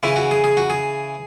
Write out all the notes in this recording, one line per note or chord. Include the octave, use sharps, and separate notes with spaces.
C#3 E3 E4
F#4
G#4
G#4
F#4
G#4